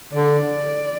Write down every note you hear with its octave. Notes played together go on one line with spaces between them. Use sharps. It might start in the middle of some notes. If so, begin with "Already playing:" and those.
D3 D5